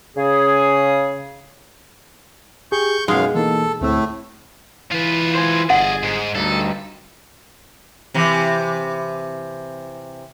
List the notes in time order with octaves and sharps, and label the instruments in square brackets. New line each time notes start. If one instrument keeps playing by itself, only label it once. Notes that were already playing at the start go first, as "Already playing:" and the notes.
[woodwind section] C#3 G#4
[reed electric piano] G4 G#4 [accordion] C#6 G6
[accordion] F#2 F5 [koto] B2 G#3 [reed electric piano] D#4
[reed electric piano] E3 A#3 D#4 [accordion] A4
[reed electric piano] D2 C4 E6 [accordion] A2 A3
[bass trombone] E3 [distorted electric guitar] F4 B4
[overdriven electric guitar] C5 G#5
[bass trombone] G1 [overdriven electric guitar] G#4 [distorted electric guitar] D5 D#5 [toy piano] F#5
[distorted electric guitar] G#2
[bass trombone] D2 [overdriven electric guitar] G2 D#4 [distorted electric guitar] A4
[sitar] C3 E3